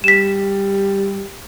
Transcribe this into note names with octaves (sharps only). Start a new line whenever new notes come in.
G3 B6 E7